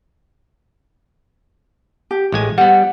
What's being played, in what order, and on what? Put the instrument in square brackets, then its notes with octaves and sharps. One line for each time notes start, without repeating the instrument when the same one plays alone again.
[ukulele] G4
[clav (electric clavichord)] A1 G#3 G#5 [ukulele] E4
[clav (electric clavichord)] G3 B3 [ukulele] F#5